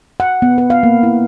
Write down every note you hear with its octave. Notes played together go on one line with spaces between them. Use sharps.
F#5
B3
B4
F5
A#3
E4